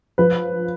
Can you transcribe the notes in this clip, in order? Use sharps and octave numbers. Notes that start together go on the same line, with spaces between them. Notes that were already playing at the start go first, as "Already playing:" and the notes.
F3 B4